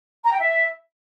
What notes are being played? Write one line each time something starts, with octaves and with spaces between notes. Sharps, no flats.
A#5
G5
E5